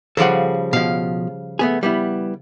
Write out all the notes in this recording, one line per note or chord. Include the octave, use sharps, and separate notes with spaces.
C#3 F3 G3 A4 F#5
B2 F3 F5
A3 B3 G#4
G3 B3 E4